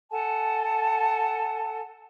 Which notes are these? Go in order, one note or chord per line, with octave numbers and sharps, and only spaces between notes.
A4 F#5 G#5 A5